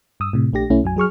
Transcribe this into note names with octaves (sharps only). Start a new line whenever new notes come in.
G2 D#6 E6
A2 C3
A#1 A3 D4 G4 A#6
B1 A3 C#4 E4
B1 F#2 F#3 G#5
F#3 G#4 C#6 F6